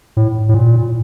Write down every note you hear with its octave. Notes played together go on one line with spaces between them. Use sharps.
A2
A2
A#2